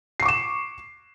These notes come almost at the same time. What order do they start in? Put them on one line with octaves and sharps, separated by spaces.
C7 C#6 D6 E7